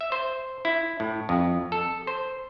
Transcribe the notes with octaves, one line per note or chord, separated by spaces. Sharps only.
E5
C5
E4
A2
F2
A4
C5